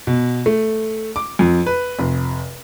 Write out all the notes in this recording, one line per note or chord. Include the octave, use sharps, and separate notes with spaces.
B2
A3
D6
F2
B4
F1